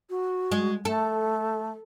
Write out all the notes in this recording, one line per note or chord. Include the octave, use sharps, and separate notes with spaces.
F#4
G#3
A3 A4